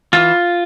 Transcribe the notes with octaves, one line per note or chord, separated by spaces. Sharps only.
E3 F4